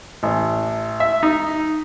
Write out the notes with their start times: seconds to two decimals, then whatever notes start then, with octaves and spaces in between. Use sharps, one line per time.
0.23 A1
1.00 E5
1.23 D#4